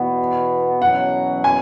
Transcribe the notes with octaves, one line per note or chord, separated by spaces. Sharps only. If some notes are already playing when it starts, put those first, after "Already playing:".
Already playing: E2 B2 B3
E2 B2 F#3 C#4 F#5
G#5